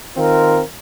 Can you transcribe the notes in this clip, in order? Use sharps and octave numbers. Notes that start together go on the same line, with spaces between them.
D#3 C4 F4 A#4